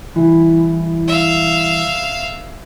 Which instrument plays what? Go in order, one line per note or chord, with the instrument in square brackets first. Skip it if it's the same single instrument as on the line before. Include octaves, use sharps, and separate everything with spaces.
[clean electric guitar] C2 E3 E4
[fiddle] E5 F5